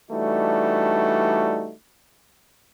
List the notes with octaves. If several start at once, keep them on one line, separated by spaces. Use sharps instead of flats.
E3 G3 A3 D4 D#4 F#4